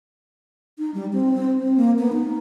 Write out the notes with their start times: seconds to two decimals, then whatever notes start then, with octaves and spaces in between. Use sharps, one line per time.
0.78 D#4
0.94 G3
1.13 C4
1.34 C4
1.60 C4
1.77 A#3
1.99 B3
2.13 D#4